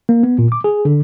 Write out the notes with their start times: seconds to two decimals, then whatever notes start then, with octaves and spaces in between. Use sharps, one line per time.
0.09 A#3
0.23 B3
0.39 A#2
0.52 D6
0.64 G#4
0.85 D3